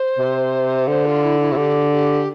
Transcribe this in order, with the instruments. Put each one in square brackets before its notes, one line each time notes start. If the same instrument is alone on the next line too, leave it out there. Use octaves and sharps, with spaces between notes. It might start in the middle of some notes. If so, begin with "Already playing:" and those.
Already playing: [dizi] C5
[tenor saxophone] C3
[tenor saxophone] D3 [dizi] C5
[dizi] F4
E4
E4
[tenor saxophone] C3
[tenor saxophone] D3 [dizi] G4
[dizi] G4